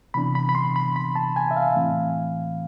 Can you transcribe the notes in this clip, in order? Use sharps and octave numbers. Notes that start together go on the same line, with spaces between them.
C3 E3 B3 D4 B5
B5
B5
C6
B5
B5
A5
G#5
E5
F5
A2 E3 A3 C4